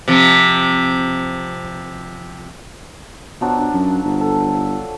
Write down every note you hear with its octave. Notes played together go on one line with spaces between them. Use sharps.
C3 F3
B2 F3 F#3 D4
D4
F#2
G1
A4